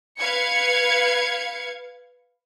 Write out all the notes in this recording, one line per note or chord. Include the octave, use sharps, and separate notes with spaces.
B4 F5 G#6 C#7